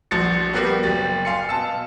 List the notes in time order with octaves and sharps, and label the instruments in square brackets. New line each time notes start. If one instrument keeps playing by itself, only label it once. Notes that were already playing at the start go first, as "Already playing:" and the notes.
[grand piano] A#1 F3 F#4 A6 C#7
G3 A#3 B3 F#4 G4
F#1 A6
F5 G#5 C6 C#7
B2 A5 E6